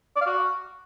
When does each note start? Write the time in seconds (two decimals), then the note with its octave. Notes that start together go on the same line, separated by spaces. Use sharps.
0.16 D5
0.21 F5
0.27 F#4